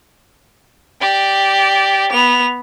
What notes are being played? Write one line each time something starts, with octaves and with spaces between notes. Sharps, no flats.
G4 D5
B3 F7